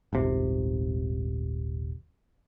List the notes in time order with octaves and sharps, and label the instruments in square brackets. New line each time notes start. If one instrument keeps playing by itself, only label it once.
[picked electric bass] D#1 G#1 C3